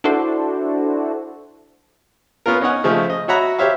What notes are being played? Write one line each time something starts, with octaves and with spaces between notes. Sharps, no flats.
D4 E4 F#4 A4 C5
B3 C#4 F4 A#4
C#4 D#4 C#5 F#5 G#5
C#3 F3 A3
D#5
F#4 C#5 E5 F#5 A#5 B5
G4 C5 C#5 E5 F5